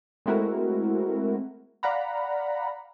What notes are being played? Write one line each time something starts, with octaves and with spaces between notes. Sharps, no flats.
G#3 A3 C4 E4 F#4 A#4
D5 F5 F#5 A#5 B5